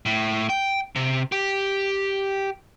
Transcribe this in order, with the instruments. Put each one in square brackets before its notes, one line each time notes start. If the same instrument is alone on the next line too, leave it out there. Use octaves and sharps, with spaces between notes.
[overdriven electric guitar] A2
G5
C3
G4